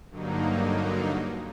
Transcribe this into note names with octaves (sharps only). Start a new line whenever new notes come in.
G2 D3 F#3 A#3 D#4